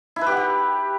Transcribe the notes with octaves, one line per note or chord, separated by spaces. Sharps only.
E4
B4
G4
F#5
G4